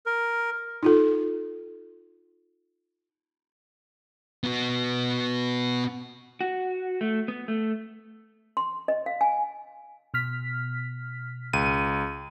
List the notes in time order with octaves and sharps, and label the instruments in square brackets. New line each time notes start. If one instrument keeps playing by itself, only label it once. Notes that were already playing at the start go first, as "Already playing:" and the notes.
[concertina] A#4
[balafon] D#4 F4 A4
[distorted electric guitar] B3 F#4
[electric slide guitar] F#4
A3
B3
A3
[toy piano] C6
D#5
F5
G#5
[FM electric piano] B2 F6 B6
[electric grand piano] C#2 D#7